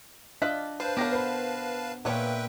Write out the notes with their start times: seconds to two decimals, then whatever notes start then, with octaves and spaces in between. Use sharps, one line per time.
0.42 D4 F4 D#5 E5 F#6 B6
0.80 B4 C5 F5 A5
0.97 B3 G4 A#4 C#5 D6 A#6
1.13 C5 B5
2.05 A#2 A3 A#3 B4 C#5 E5 G5